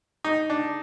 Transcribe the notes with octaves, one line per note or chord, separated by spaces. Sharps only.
D#4
D4